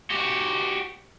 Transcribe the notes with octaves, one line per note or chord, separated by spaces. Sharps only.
F#4 G4